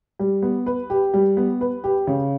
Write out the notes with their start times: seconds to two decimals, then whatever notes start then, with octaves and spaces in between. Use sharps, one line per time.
0.19 G3
0.43 B3
0.66 B4
0.90 G4
1.14 G3
1.37 B3
1.61 B4
1.84 G4
2.07 C#3